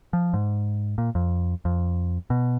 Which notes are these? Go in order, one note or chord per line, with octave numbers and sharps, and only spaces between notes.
F3
G#2
A#2
F2
F2
B2